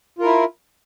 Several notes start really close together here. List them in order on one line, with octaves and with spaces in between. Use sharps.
F4 A#4 E4